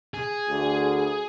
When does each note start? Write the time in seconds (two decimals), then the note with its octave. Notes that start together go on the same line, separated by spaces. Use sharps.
0.14 G#4
0.48 D2